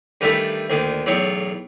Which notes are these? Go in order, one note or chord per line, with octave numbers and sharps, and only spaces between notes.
G2 D#3 E3 G3 A3 E5
D2 A#2 D#3
B1 E2 A2 C#5